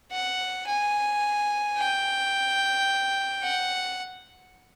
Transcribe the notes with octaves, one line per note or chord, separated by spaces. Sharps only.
F#5
G#5
G5
F#5